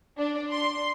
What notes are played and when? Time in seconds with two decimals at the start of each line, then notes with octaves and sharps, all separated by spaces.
0.19 D4
0.52 C6